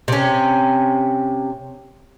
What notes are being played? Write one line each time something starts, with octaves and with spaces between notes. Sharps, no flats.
C3 C#4